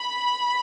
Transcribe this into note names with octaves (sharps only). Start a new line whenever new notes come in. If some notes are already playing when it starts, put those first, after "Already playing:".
Already playing: B5